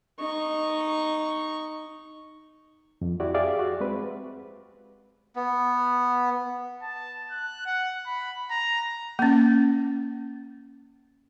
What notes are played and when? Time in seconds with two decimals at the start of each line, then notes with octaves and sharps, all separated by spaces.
0.19 D#4 C#6
3.01 F2
3.20 E4 F#4 G4 D5
3.34 G4 G#4 D5 E5 F5
3.59 F#4
3.80 G#3 C4 B4
5.36 B3
6.82 A5
7.31 F#6
7.66 F#5
8.06 B5
8.51 A#5
9.19 A#3 C#4